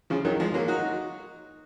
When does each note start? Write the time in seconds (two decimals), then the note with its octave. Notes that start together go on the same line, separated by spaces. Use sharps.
0.10 C#3 F3
0.25 D#3 F#3
0.40 F3 G#3
0.54 F#3 A#3
0.68 D#4 F#4